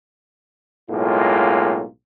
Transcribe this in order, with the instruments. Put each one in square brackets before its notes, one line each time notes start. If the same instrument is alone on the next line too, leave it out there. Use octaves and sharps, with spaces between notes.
[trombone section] B1 A2 G#3 A#3 F4